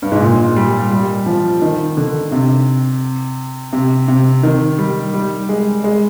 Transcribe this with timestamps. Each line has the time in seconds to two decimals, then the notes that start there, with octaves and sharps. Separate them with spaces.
0.02 G2
0.12 G#2
0.21 A#2
0.56 G3
0.91 G3
1.26 F3
1.62 D#3
1.97 D3
2.32 C3
3.73 C3
4.08 C3
4.43 D#3
4.78 G3
5.14 G3
5.49 G#3
5.84 G#3